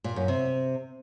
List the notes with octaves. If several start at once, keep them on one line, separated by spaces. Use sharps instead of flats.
A#2
F#2
C3